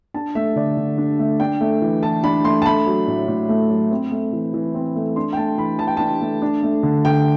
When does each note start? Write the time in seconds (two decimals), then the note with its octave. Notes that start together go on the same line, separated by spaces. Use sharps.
0.14 D4 A5
0.35 A3 E5
0.56 D3 D5
0.77 D3
0.98 D4
1.19 A3
1.40 D4 G5
1.61 A3
1.82 E3
2.02 E3 A5
2.23 D4 B5
2.44 A3 C6
2.62 A5
2.66 A3 B5
2.86 F#3
3.07 A2
3.28 A2
3.49 A3
3.70 F#3
3.91 C4
4.12 A3
4.33 E3
4.54 E3
4.74 C4
4.96 A3
5.16 D4 C6
5.33 G5
5.37 A3 A5
5.58 E3 B5
5.79 E3 A5
5.87 G5
5.97 D4 A5
6.21 A3
6.42 D4
6.63 A3
6.83 D3
7.05 D3 G5